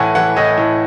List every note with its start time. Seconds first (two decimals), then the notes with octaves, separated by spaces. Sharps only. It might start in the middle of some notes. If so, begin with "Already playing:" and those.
Already playing: A2 E3 F#5 G#5 A5
0.15 E3 F#5
0.36 A2 D#5
0.58 A2